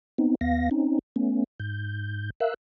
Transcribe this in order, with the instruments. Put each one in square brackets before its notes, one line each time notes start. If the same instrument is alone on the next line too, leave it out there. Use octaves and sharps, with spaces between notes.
[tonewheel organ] B3 C4 D#4
D#2 B3 F5 A#6
C4 C#4 D#4
A3 B3 C#4
G#2 G6
A#4 E5 F5 E6 F#6